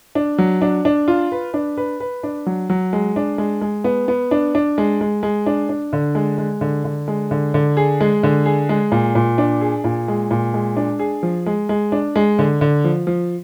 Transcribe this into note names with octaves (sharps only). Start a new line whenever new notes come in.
D4
F#3
D4
D4
F4
B4
D4
B4
B4
D4
F#3
F#3
G#3
D4
G#3
G#3
B3
B3
D4
D4
G#3
G#3
G#3
D4
D4
D3
G#3
G#3
D3
D3
G#3
D3
D3
G#4
G#3
D3
G#4
G#3
A#2
A#2
D4
G#4
A#2
G#3
A#2
G#3
D4
G#4
F3
G#3
G#3
D4
G#3
D3
D3
F3
F3